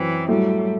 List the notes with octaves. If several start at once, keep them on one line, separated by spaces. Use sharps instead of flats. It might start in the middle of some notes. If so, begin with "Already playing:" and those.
Already playing: F#2 E3 F#3 C4
A2 F#3 G3 A3